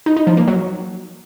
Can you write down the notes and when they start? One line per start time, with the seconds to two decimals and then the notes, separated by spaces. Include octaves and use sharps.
0.06 D#4
0.17 D#4
0.27 F3
0.37 A#3
0.47 F#3